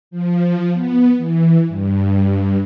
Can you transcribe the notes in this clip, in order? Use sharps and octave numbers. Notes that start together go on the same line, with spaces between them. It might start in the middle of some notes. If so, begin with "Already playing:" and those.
F3
B3
E3
G2